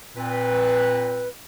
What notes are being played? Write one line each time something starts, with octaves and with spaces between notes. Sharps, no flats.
A#2 C4 B4